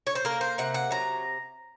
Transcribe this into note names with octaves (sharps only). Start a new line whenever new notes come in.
C#5
C5
A#3 A#4
C5
C3 F#5
F#5
F#3 A#5